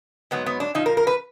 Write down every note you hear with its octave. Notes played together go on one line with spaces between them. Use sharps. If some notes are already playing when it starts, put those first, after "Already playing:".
G#2 F#3 B3
B3
D4
A#2 F3 D#4
A#4
A#4
B4